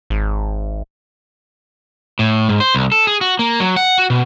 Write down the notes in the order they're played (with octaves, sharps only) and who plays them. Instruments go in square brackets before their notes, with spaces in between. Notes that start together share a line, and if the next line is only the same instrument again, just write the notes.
[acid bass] G#1
[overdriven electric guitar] A2
G#2
C5
C2
A4
G#4
F#4
A#3
F#3
F#5
F#4
B2